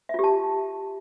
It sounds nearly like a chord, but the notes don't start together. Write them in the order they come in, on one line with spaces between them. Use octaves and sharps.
E5 F4 G4 A5